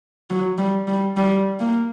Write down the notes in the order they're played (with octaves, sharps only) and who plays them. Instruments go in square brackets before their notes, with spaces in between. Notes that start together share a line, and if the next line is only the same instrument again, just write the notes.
[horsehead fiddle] F#3
G3
G3
G3
A#3